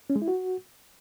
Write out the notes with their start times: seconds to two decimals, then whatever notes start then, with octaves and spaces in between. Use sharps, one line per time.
0.10 C#4
0.16 G#3
0.22 E4
0.28 F#4